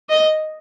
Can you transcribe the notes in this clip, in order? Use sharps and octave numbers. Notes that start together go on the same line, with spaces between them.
D#5